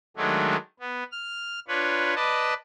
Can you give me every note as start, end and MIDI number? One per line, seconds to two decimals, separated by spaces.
0.17 0.56 51
0.17 0.56 54
0.17 0.56 56
0.17 0.56 57
0.17 0.56 62
0.79 1.03 59
1.12 1.59 89
1.68 2.14 62
1.68 2.14 65
1.68 2.14 71
1.68 2.14 73
2.16 2.54 71
2.16 2.54 74
2.16 2.54 75
2.16 2.54 81